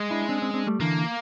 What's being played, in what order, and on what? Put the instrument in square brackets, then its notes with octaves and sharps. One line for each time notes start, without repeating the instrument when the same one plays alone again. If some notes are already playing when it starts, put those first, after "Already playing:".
Already playing: [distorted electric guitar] G#3
[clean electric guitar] D4 E4
C4 D4
C4 D4
C#4
C4 D4
G3 A3
[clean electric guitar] D3 E3 [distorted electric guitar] A#3